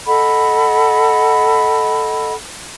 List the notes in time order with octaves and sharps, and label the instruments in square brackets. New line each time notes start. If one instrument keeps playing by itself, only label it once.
[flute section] A4 D#5 F#5 B5